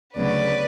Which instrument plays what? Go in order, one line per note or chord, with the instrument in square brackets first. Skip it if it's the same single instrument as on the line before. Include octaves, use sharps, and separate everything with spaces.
[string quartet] D2 C#3 F#3 B3 B4 D5